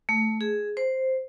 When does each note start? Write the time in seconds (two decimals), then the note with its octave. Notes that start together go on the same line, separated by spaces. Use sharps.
0.09 A3
0.41 G#4
0.77 C5